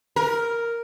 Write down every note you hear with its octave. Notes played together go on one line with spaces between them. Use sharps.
A#4